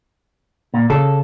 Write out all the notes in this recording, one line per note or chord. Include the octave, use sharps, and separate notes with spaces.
A#2
C#3 A4